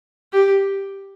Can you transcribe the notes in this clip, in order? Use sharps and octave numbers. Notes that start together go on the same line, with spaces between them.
G4